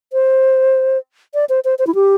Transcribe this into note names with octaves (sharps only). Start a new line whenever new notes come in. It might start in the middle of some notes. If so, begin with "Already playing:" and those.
C5
D5
C5
C5
C5
E4
G4